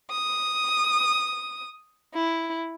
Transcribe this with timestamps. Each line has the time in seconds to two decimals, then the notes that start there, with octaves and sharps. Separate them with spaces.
0.11 D#6
2.14 E4